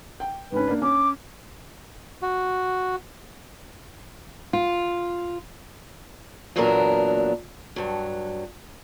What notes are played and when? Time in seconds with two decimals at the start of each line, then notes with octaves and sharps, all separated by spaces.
0.20 G5
0.52 G#2 C#4 B4
0.67 A#3 D4
0.82 C#4 D6
2.22 F#4
4.53 F4
6.56 E2 A#2 F#3 B3 D4 A#4
7.76 G2 F#3